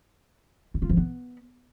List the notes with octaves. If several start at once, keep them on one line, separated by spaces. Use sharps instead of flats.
E4
F4
F3
B3